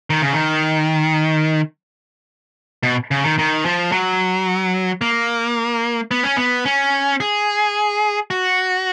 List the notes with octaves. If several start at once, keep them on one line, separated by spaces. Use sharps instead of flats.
D#3
C#3
D#3
B2
C#3
D#3
D#3
F3
F#3
A#3
B3
C#4
B3
C#4
G#4
F#4